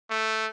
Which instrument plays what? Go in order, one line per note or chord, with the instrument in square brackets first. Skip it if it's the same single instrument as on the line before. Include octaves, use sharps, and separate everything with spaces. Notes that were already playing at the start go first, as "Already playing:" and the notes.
[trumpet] A3